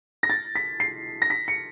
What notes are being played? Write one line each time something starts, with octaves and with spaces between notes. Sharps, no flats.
A#6
A6
B6
C7
A#6
B6
C#7